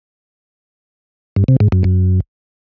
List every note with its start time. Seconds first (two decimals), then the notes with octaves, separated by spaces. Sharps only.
1.36 G2
1.48 C3
1.60 G#2
1.72 F#2
1.84 F#2